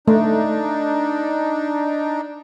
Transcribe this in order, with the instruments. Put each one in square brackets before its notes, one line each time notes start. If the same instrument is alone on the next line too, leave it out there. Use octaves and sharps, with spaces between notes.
[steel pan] A3 [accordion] D4 D#4